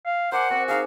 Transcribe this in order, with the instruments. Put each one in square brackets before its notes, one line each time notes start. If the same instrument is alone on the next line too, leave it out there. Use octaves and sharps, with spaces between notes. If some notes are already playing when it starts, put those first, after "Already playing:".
[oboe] F5
[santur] A#4 D5 G#5 [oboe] C5 [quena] F#5
[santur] C4 [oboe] F#4
[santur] D#4 G#4 [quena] F5